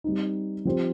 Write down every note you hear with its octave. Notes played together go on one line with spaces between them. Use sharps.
G3 C4 D#4
F3 C4 G4 C5